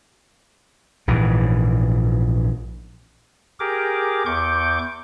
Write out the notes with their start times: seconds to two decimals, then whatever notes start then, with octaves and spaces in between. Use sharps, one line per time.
1.08 A#1 G#2 E3
3.60 G4 G#4 A#4 D6
4.26 E2 C#6 D6 G6